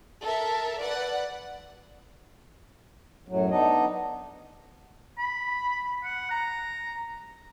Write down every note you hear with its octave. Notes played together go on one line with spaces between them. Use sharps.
A4 A#4 E5
B4 D5 F#5
F#2 A2 F#3
B3 D4 D#4 D#5
B5
F#5
A#5